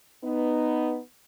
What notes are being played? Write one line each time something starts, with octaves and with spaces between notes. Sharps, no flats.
B3 D#4